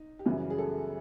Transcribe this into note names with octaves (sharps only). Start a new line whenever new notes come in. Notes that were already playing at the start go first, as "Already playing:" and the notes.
Already playing: D#4
G4
F#2 C#3 E3 G3 F#4
G#4
A4